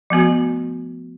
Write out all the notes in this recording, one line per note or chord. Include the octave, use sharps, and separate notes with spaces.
F3 A3 B3 F#4